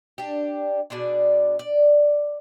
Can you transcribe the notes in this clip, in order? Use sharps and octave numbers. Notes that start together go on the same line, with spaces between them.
D4 G4
B2 D4 G#4 D5
D5